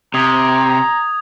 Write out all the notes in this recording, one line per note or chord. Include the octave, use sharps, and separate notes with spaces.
C3 A#5 D#6 G#6 F7